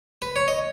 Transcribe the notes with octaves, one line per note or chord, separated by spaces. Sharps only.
B4
C#5
D#5